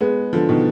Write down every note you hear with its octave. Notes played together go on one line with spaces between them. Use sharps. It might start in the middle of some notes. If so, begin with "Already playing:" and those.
G#3 B3
D3 F3
B2 D#3